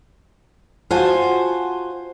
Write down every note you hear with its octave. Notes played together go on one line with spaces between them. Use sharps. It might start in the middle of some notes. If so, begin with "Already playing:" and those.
F4 F#4 C5 G#5 A5